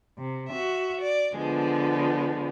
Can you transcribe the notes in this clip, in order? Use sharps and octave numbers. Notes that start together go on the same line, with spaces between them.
C3
F#4 E5
D5
D3 F3 G#3 B3